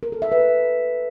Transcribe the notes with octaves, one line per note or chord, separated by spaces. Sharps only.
A#4
A4
E5
B4